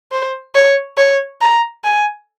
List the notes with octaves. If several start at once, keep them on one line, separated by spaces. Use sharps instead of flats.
C5
C#5
C#5
A#5
G#5